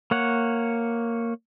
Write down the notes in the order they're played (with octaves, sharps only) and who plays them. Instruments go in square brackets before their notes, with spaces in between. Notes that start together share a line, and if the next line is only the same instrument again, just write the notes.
[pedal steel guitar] A#3 C#5 F#5